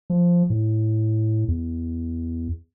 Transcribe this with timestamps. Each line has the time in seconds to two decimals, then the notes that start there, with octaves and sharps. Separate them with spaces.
0.10 F3
0.50 A2
1.48 E2